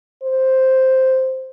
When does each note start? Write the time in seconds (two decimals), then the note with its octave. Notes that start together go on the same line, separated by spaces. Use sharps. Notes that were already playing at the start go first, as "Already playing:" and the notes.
0.23 C5